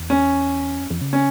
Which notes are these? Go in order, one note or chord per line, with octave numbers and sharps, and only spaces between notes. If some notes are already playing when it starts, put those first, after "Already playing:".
Already playing: E2
C#4
F2
F2
C#3
C#4